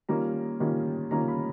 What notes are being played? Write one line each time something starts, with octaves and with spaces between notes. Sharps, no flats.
D#3 G3 A#3 C#4 F4 A#5
D#3 G3 A#3 C#4 F4
D#3 G3 A#3 C#4 F4 A#5
B5